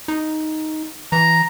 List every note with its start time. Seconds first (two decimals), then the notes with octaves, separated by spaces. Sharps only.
0.08 D#4
1.12 E3 A#5